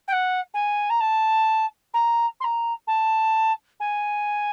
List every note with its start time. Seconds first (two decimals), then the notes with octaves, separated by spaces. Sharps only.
0.08 G5
0.12 F#5
0.54 G#5
0.90 A#5
1.00 A5
1.94 A#5
2.40 C6
2.44 A#5
2.87 A5
3.80 G#5